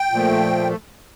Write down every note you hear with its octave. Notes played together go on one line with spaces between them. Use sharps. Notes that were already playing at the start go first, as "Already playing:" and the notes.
Already playing: G5
A#2 F3 A3